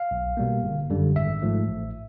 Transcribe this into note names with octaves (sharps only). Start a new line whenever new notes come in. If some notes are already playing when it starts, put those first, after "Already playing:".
Already playing: F5
B1
B2 G3 A#3
G1
F#2 D3 G3
G#1 E5
G#2 F3 A3
A1